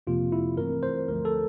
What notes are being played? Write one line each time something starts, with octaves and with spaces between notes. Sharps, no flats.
F2 C3 F3 A#3 F4
E4
A1 G2 E3 A3 C4 A#4
C5
D2 D3 F3 A3 A#4
A4